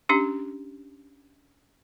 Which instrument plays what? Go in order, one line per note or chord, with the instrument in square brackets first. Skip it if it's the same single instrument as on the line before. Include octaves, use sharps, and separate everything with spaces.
[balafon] C#4 D4 G4